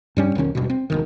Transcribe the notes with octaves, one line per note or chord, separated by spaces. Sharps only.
G2 G3 C#4
E1 B1 D#3 C#4
E1 G2 B2
C4
E1 C#2 D#3